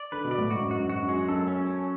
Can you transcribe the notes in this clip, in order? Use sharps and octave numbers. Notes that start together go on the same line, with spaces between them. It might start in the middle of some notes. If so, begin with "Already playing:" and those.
Already playing: D5
D3 B4
B2
D5
A2
G#2 F#4
F#2
G#2 F#4
F#2
G#2 F#4
F#2
G#3
F#2
F#2 A4
C#4
C#4